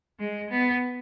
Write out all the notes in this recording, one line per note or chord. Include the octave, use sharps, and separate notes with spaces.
G#3
B3